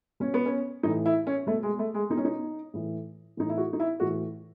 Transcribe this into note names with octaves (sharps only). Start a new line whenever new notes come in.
B2 C#4
B3
C#4
A2 E3 D#4
E4
C#4
B2 A3
G#3
A3
G#3
B2 D#4
C#4
D#4
A2 E3
A2 E3 D#4
E4
F#4
D#4
E4
A2 E3 F#4